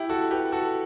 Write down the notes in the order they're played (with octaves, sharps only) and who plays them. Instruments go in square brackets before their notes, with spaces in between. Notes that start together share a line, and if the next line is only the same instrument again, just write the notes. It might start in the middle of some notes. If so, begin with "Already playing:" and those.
Already playing: [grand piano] E4 G4
F#4 A4
G4 B4
F#4 A4